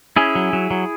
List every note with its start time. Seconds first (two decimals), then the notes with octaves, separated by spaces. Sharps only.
0.16 C#4 E4 G#4
0.35 F#3
0.53 F#3
0.71 F#3